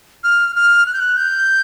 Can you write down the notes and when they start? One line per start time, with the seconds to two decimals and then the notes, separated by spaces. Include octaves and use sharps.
0.24 F6
0.56 F6
0.86 F#6
0.93 G6
1.00 F#6
1.17 G6